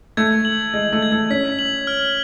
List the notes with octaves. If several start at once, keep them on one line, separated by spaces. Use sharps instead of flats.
A3 G#6
F#7
G#3 G#6
A3
G#6
A3
C#4 B6
F#7
F6